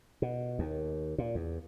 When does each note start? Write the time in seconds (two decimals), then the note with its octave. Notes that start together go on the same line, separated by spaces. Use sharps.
0.22 B2
0.59 D#2
1.18 A#2
1.35 E2